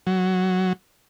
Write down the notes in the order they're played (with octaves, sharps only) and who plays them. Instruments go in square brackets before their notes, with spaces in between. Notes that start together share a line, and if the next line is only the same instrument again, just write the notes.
[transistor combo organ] F#3